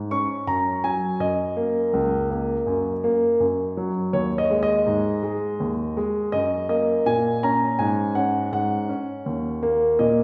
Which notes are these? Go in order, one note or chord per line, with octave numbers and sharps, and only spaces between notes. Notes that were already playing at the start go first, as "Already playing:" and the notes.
Already playing: G#2
C#4 C#6
F#2 A#5
F#3 G#5
F#2 D#5
A#3
C#2
A#3
F#2
A#3
F#2
F#3
D#2 C#5
D#5
G#3
D#5
G#2
G#3
D#2
G#3
F#2 D#5
A#3 D#5
A#2 G#5
C#4 A#5
G#2 G#5
C#4 F#5
G#2 F#5
C#4
D#2
A#3
A#2 D#5